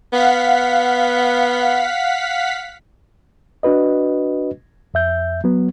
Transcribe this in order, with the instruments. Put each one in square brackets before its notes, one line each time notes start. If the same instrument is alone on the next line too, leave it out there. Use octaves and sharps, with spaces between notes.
[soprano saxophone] B3 [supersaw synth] F5 F#5 B6
[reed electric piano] D4 F#4 B4 D#5
F2 E5 G6
F#3 B3